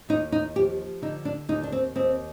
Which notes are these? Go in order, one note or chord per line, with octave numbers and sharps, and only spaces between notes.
D#2 D#4
D#4
F3 G4
D3 D#4
D4
D#2 D#4
D4
C4
D#2 C4